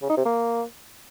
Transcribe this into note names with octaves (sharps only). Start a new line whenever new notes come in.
C#3
D#4
C3
A#3